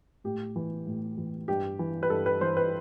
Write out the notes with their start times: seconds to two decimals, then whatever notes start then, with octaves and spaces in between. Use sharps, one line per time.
0.24 A2 G4
0.56 E3
0.87 A2
1.18 E3
1.48 G2 G4
1.79 E3
2.03 B4
2.10 G2 A4
2.26 B4
2.41 E3 C5
2.57 B4